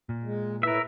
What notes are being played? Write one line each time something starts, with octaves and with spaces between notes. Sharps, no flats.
A#2
G#3
A2 E4 A#4 B4 E5